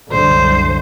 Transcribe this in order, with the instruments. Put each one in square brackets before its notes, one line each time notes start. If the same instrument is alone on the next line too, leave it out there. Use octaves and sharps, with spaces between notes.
[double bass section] C2 F#2 D3 [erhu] C5